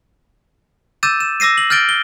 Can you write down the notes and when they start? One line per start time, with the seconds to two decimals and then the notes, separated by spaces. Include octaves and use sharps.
1.03 D6 E6 G6 A6 D#7 E7
1.20 E7
1.40 D6 E6 A#6 C7 D#7
1.58 F#7
1.70 F6 G6 A6 D7 G7
1.89 G7